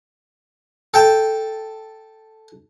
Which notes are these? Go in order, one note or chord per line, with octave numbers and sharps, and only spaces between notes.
A4 G5 A5